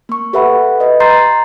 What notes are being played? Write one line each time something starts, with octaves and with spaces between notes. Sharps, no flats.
A#3 C#6
G4 A4 B4 E5 F#5 B5
B4 D#5
A#5 C6 G6 A6 C7